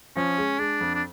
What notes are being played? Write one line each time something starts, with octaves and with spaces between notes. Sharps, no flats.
F3 C#4
G#3
G#3 D4
F2
D4